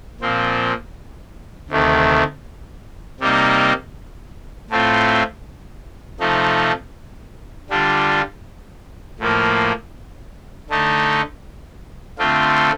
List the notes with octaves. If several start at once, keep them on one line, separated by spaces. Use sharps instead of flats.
A#2 F3 C4
D2 C3 D#3 A3
C3 G3 A#3 D#4
A2 A3 C4 F4
C3 F3 A3 D#4
D3 G3 D4 F4
A2 F3 A#3
D3 A3 D#4
D3 A3 C4 F4